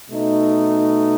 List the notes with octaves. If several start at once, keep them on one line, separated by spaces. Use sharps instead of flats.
B2 A3 D#4